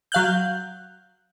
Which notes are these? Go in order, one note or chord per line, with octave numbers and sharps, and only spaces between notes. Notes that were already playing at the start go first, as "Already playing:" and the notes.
F#3 F5 F#6 G6